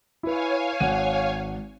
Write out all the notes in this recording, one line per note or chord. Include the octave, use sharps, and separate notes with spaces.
E4 B4 C#5 F5 G#5
G#1 F#5 D#7